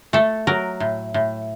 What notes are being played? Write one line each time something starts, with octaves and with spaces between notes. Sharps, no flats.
A3 A4
F#3 A#4
A2
A2